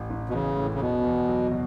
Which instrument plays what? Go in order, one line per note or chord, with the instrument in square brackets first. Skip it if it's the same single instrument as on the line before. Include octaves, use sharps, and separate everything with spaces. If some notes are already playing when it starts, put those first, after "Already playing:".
Already playing: [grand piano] A1
A1
[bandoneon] B2
[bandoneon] C#3 [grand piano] E3
[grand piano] A2
[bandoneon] C#3
[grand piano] E2 [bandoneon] B2
[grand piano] E2
F#3
B2